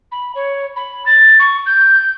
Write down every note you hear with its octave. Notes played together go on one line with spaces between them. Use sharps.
B5
C#5
B5
A6
C#6
G6